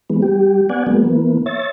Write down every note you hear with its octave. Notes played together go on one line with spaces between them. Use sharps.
E3 G#3 B3
G3 G4
B3 D5 F#5 G#5
F#3 G#3 A#3 B3
E3 A#3 B3
C#5 E5 A6